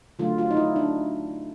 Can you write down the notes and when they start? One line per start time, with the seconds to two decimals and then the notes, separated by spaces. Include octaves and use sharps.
0.19 D3 F#3 A3 F4
0.38 F4
0.51 D#4
0.57 E4
0.76 D4